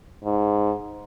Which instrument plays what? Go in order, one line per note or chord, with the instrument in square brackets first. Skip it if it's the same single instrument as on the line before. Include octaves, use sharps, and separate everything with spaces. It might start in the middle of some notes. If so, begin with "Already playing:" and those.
[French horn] G#2